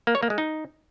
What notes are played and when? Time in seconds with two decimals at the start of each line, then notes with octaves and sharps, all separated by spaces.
0.07 A#3
0.15 C#5
0.23 A#3
0.30 G#3
0.38 D#4